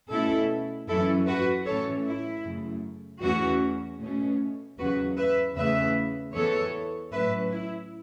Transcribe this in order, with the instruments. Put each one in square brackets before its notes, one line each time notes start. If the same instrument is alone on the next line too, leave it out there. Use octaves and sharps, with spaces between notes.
[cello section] B2 A3 C#4 E4 A4
F#2 E3 C#4 E4 A4
F#4 B4
A2 E3 A3 C#4 A4 C#5
E4
F#2 C#3 A3
E2 E3 A3 C#4 F#4
B2 A3 C#4
E2 C#3 F#3 C#4 F#4 B4
B4 E5
E2 C#3 A3 B4 E5
E2 E3 B3 A4 C#5
A2 F#3 C#4 B4 E5
E4